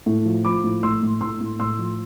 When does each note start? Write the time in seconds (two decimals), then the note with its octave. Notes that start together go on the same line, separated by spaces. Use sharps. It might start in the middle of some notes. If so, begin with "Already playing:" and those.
0.06 A2
0.25 F3
0.45 F3 B5 D6
0.64 A2
0.83 A2 C6 E6
1.02 A2
1.21 A2 C6 E6
1.41 A2
1.60 A2 C6 E6
1.79 F3